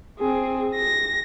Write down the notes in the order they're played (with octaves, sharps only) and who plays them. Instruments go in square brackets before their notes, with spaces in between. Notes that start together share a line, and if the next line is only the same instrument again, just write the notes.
[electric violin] C4 G#4
A#6